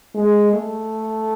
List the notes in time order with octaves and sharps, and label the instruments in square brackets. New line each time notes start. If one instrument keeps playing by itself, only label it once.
[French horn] G#3
A3